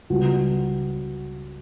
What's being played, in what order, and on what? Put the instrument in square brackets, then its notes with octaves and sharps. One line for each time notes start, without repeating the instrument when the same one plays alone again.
[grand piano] C#2 C#3 G3 B3 F#4